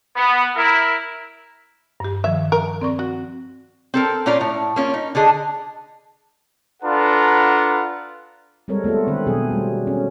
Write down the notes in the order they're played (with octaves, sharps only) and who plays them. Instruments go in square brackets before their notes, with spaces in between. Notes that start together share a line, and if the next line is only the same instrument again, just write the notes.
[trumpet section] B3
E4 A#4
[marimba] G2 G4
[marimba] D#3 F3 [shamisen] E5
[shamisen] A#4
[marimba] C4 D5 C#6
[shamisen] F#4
[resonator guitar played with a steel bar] C4 A4 A#4
A#2 C#4 F4 D5 A#5
A2
A#3 C#4 F4
D#4
D3 D4 G#4 D#5
[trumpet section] D4 F4 A4 B4 F#5 A#5
[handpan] G3 G#3 C4 A4 A#4 C#5
A3 B3 F4 A4
D3 D#3 C4 B4
B2 F#3 B3 G#4
G3 A3
C#4